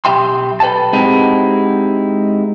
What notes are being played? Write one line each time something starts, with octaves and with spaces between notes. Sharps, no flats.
B1 G4 E5 G5 C6
A4 B4 C#5 G5 A5
G#3 C4 D#4 E4 F#4 G4